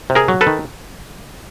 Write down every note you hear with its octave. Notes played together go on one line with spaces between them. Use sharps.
C3
G#4 A#4
F#3
A4 B4
D#3